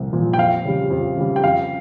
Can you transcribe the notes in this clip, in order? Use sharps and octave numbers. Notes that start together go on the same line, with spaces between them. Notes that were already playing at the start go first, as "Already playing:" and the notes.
Already playing: C2 A#2 F3
A#2 F3
G5
F2 F5
C#3 G3
F2
C#3 G3
G5
F2 F5